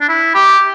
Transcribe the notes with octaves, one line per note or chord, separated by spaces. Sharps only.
D4
E4
G4